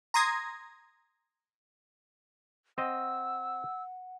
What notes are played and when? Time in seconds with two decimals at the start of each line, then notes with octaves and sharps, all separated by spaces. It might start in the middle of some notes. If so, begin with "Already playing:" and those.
0.14 A#5 C6 D#6 G#6 A#6
2.78 C4 D#5 F#5 E6